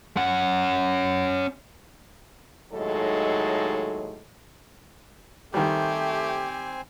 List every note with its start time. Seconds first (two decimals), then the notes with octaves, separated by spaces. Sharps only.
0.17 C#4 F#5
2.72 D#2 A2 F#3 G#3 D#4 A4
5.54 D#3 G3 A3 C4 G4 C5 G#5